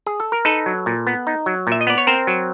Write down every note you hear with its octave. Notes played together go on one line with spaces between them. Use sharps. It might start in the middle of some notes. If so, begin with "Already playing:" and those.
G#4
A4
A#4
D#4 A4 B4
F#3
A#2
B3
D#4
F#3
A#2 E5
D#5
B3 D5
C#5
C4 A#4 C5
F#3